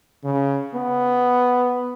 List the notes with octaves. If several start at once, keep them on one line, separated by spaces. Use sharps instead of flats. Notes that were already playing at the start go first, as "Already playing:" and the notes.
C#3
B3